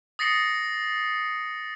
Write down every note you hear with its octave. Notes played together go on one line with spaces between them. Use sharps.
D#6 A6 A#6 C7 C#7 F#7